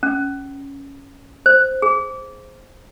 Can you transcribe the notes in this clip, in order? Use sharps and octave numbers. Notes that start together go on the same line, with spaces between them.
C#4
C5
G#4